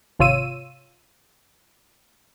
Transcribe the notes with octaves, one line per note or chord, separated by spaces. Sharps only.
G#1 C3 F4 C#5 E6 D#7